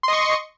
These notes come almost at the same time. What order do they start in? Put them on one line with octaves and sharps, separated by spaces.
C6 D#5 C#6